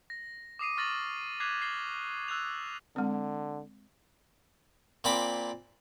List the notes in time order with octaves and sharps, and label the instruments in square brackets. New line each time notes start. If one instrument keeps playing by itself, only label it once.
[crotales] A#6
D6 D#6 C7 D#7
C#6 F6 A6 A#6 F#7
D6 F#6 G#6 B6 C7 F7
A6 C7 F#7 G7
D6 E6 F#6 G#6 F7
[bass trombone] D3 [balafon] G#3 C4
[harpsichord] A#2 C4 B5 D6